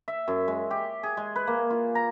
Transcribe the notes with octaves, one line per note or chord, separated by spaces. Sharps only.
E5
F#2
G#3
G4
G#4
G#3
B4
A#3
F4
A#5